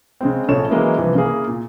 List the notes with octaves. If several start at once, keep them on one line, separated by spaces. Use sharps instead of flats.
C#3 G#3 C4
A#1 C#3 A4 C#5 E7
E3 F#3 G#3 A#3 C#4 E4
C2 G2 E3 F3
C#3 A#3 E4 G#4 A#4
A#2